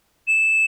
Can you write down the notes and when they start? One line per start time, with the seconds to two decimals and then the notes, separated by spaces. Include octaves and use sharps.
0.28 E7